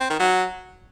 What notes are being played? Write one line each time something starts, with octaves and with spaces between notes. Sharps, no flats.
C4
D#3
F#3